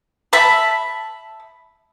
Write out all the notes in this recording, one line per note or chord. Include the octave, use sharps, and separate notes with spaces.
E5 A5 B5